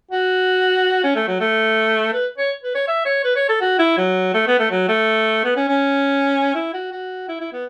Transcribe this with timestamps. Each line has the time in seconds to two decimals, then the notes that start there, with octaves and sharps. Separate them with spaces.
0.11 F#4
1.04 C#4
1.16 A3
1.28 F#3
1.40 A3
2.14 B4
2.38 C#5
2.63 B4
2.75 C#5
2.88 E5
3.05 C#5
3.24 B4
3.36 C#5
3.49 A4
3.61 F#4
3.79 E4
3.98 F#3
4.34 A3
4.47 B3
4.59 A3
4.71 F#3
4.89 A3
5.44 B3
5.57 C#4
5.69 C#4
6.55 E4
6.74 F#4
6.92 F#4
7.28 E4
7.41 E4
7.53 B3